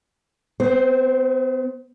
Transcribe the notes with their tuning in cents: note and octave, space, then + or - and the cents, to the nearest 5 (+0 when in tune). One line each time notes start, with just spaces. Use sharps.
B3 +45 C5 +5